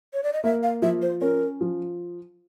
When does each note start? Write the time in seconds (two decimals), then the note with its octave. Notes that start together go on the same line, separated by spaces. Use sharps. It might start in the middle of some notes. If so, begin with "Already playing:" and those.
0.14 C#5
0.23 D5
0.33 D#5
0.44 A#3 E5
0.63 F5
0.82 F3 E5
1.02 C5
1.21 C#4 A#4
1.61 F3